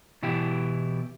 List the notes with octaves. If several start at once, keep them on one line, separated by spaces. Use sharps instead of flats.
B2 E3 E4 G4